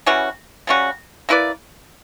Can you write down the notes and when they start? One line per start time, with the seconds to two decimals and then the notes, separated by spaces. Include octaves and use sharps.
0.06 E3 G3 C#4 F#4
0.67 C#3 G3 C#4 F#4
1.29 A#3 E4 B4 D5